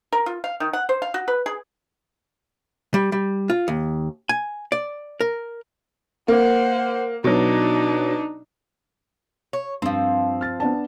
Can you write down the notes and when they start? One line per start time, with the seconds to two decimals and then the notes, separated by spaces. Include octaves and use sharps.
0.12 A#4
0.26 F4
0.44 F5
0.60 D#3
0.73 F#5
0.89 C5
1.02 F5
1.14 F#4
1.28 B4
1.46 G#4
2.94 G3
3.12 G3
3.50 F4
3.68 D#2
4.29 G#5
4.72 D5
5.21 A#4
6.28 A#3 C5 F#5
7.24 B2 F#3 D4 D#4
9.53 C#5
9.82 G2 F3 C4
10.41 F6 A6
10.60 B3 D4 A5